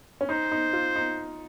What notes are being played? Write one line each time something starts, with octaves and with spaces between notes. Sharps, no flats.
C#4
D#4 C5
D#4
F4
D#4